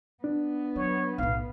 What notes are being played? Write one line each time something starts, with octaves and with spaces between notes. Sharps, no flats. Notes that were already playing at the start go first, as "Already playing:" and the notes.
B3 D4
F#3 C#5
B1 A2 F5